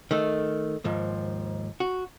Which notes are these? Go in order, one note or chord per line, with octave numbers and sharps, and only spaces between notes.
D#3 A3
D#2 G#2 F3
F#4